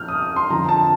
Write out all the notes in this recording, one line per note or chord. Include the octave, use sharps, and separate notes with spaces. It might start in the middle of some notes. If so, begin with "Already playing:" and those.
Already playing: A#2 F3 F6 G6
D#6
D#6
C6
F2 D3 F3 A#5
A5